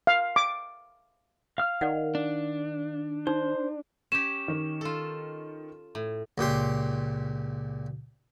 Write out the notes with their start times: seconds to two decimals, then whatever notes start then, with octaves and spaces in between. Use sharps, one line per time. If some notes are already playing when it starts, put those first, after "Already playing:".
0.07 F5
0.36 D6
1.58 F5 F6
1.81 D#3 D5 F#5
2.15 D4
3.27 D#4 C5
4.12 C#4 G4 E7
4.48 D#3
4.81 F4 A4
5.95 A2
6.38 C#2 A#2 G4 C6